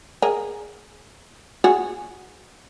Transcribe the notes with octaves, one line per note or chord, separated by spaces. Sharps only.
G#4 A#4
F#4 G#4